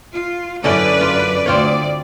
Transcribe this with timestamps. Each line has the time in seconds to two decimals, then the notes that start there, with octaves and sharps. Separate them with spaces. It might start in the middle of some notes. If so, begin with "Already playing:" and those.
0.13 F4
0.64 F#2 D3 C#4 E4 B4 D5
1.01 F4
1.46 D2 C4 F4 C#5 D5